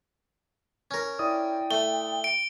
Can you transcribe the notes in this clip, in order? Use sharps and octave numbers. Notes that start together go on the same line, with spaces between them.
C#4 A#4
E4 D5 G5 D#6
A3 G7
D7